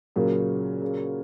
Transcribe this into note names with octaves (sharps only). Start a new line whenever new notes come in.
A#2 C#3 F#3 A#3
C#3